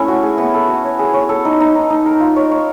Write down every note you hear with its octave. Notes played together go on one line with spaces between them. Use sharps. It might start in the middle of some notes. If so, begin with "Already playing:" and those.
Already playing: A3 C#4 E4 A4
F#4
G#4
B3
A4
F#4
C#5
G#4
C#5
A4
D#4
D#4
D#4
D#4
A#4
F4
C#5
C#5